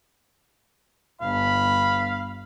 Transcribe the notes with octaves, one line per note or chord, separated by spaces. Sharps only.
G1 F5 B5